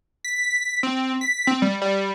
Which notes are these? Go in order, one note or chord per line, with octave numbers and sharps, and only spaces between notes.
B6
C4
B6
C4
G3
G3